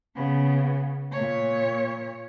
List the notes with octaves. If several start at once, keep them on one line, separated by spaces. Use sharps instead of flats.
C#3 B3
A#2 C#5